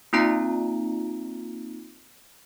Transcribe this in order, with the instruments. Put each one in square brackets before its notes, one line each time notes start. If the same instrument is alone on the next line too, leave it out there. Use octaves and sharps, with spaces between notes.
[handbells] A#3 C4 D#4 F4 A#5